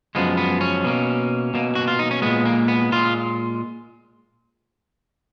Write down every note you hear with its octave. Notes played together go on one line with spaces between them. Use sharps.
F#2 F3 G#3 B3
B3
C#4
B2 A#3
B2 A#3
F#4
F4
D#4
C#4
A#2 G#3 B3
A#3
B3
A#2 G#3 F4